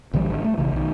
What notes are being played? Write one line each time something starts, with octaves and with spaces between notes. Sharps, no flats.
A#1 D3 E3 G3
G#1 D3
A3
A#1 C#3 E3
B1 D#3